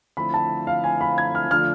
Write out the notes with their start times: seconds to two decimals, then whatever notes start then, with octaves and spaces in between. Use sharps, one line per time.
0.17 D3 F3 A3 C4 E4 B5
0.34 A5
0.67 F5
0.84 G#5
1.01 B5
1.18 G#6
1.35 F6
1.51 D3 F3 A3 D4 F4 F6